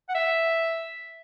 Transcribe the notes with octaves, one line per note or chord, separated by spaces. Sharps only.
F#5
E5